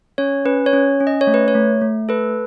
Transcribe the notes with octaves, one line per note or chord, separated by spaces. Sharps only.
C#4 C#5
C#4 B4
C#5
C#4
C#4
D#5
C#5
A3
B4
C#5
A3
A3
A4 B4